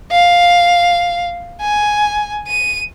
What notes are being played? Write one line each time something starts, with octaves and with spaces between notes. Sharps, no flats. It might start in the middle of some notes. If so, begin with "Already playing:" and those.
F5
G#5
D#7